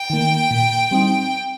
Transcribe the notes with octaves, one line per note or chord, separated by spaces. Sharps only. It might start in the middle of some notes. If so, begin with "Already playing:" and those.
Already playing: G5
D#3 A#3
A#2
G3 C4 D#4